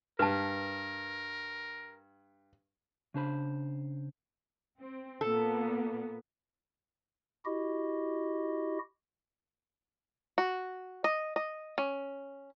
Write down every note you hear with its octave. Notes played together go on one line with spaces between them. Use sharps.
G2 A#4 B4 A5
C#3 D4 C5 B5
C4
A#2 A#3 B3 A4
E4 F#4 G4 D#5
F#4
D#5
D#5
C#4